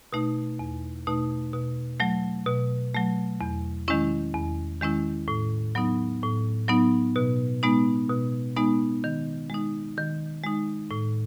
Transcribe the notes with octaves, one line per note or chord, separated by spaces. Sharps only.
B2 A3 D#4
E2
B2 A3 D#4
B2
F#3 A3
B2
F#3 A3
E2
D#3 G#3 C#4 E4
E2
D#3 G#3 C#4 E4
A2
F#3 B3 D#4
A2
F#3 B3 D#4
B2
G#3 B3 D#4
B2
G#3 B3 D#4
D#3
G#3 D#4
D#3
G#3 D#4
A2